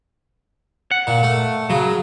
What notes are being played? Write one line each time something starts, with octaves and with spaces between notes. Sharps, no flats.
F#5
A#2
A3
C#3 F#3